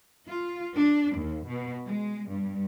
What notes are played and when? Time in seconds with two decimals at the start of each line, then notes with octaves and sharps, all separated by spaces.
0.28 F4
0.76 D4
1.18 D#2
1.47 B2
1.85 G#3
2.30 G2